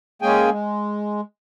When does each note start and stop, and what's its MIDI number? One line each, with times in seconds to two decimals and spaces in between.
0.22 0.50 56
0.22 0.50 58
0.22 0.50 61
0.22 0.50 68
0.22 0.50 79
0.22 0.50 80
0.51 1.21 56